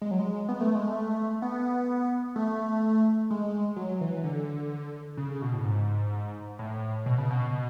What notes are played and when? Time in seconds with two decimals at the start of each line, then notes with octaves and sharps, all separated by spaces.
0.02 G#3
0.11 F#3
0.20 G#3
0.49 B3
0.61 A3
0.75 G#3
0.87 A3
1.42 B3
2.36 A3
3.31 G#3
3.76 F#3
4.01 E3
4.24 D3
5.17 C#3
5.42 B2
5.53 A2
5.65 G#2
6.59 A2
7.06 B2
7.18 C#3
7.31 B2
7.52 B2